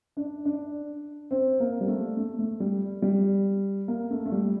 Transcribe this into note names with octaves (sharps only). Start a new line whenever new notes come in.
D4
D4
C4
A#3
G3
A3
A3
A3
G3
G3
A#3
A3
A3
G3